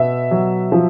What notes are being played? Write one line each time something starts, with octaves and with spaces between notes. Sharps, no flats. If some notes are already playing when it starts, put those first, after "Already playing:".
Already playing: B2 E5
F#3
F3